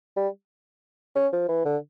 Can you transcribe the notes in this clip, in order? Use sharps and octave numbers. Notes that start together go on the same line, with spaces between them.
G3
C#4
F3
E3
D3